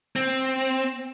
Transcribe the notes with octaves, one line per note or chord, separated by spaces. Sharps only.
C4